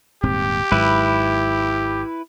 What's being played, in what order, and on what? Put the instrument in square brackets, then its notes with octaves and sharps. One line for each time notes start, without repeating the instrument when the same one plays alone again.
[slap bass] D#1 G#2 C4 [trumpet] G4
[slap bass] G#1 G#2 F#3 [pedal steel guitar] E4 B4